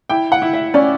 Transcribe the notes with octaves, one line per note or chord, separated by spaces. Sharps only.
E4 G5
F#5
E4
E5
C#4 D5